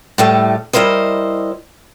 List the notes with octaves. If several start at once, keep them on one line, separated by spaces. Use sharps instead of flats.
A2 G3 A3
G3 E4 A#4 C5 D#5